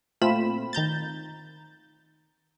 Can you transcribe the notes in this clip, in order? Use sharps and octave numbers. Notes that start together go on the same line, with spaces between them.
A#2 A3 C4 F4 B5 E7
D#3 A#5 G6 A6